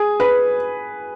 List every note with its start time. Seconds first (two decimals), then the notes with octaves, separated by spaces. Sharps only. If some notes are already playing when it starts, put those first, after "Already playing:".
Already playing: G#4
0.20 B4